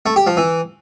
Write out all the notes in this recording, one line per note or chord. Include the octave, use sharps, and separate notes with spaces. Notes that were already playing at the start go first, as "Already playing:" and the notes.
A3
G4
F3
E3